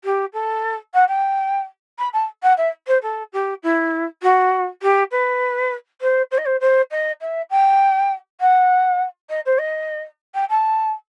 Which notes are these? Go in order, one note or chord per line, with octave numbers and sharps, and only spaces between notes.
G4
A4
F#5
G5
B5
A5
F#5
E5
C5
A4
G4
E4
F#4
G4
B4
C5
C5
D#5
C5
C5
D#5
E5
G5
F#5
D#5
C5
D#5
G5
A5